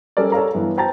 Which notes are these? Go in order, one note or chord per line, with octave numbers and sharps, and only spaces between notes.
G3 C#4 A4 A#4 D5
A4 C#5 F5 A#5
G2 E3 B3
B4 C5 G5 A5 A#5 A6